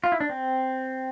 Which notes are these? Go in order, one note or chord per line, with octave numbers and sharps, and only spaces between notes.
F4
E4
D4
C4